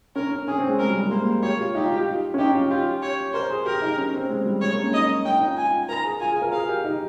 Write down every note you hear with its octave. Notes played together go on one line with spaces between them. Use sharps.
C#4 A#4
C#4
C#4 G#4
C4
G#3
G#3 A#4
G3
G#3
A#3 C5
G4 C#5
F4
D#4 G4
F4
G4
C#4
D#4 G4
F4
F4 G4
C#5
A#4 C5
G#4
G4 A#4
D#4
C#4
C4
G#3
G3
G#3 C#5
A#3
C#4
D#4 D#5
C#4 G5
D#4
F4
G#5
A#4 A#5
G#4
F4 G#5
G#4
A#4
G#4 F5
G4
D#4